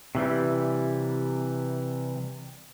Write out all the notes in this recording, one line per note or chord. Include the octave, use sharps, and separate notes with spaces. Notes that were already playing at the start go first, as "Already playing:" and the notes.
C3 E3 G3